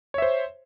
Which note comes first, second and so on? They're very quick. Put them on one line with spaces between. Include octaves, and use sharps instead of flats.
C#5 E5 C5